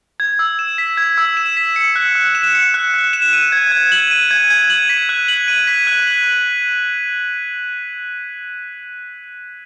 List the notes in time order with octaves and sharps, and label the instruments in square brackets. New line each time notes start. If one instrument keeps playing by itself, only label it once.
[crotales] G#6
E6
E7
B6
G#6
E6
E7
B6
C#7
F#6
F#6
E7
C#7
F#6
F#6
E7
D#7
G#6
G#6
F#7
D#7
G#6
G#6
F#7
B6
F#6
F#7
D#7
B6
F#6
F#7